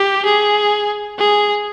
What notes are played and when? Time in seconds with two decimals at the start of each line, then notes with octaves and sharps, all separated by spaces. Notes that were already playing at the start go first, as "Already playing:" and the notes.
Already playing: G4
0.25 G#4
1.18 G#4